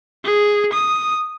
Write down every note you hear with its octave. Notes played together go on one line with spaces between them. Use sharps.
G#4
D#6